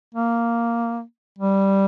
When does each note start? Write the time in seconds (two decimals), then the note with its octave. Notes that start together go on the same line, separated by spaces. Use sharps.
0.15 A#3
1.39 G3